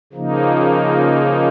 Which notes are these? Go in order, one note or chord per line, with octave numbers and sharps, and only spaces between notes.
C#3 F3 A#3 D#4